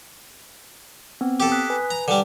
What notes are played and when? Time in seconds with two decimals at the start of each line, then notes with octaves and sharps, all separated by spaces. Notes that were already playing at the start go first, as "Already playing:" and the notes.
1.21 B3 C4
1.40 G4 A4
1.51 D#6 F#6 B6
1.70 B4 G#5
1.91 A#5
2.08 D3 G3